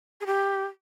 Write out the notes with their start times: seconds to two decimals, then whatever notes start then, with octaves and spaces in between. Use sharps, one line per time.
0.21 G#4
0.26 G4